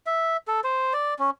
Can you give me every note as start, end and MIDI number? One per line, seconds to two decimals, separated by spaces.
0.06 0.37 76
0.48 0.60 69
0.64 0.93 72
0.93 1.14 74
1.19 1.30 61